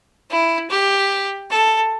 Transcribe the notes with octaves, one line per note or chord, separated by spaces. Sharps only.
E4
G4
A4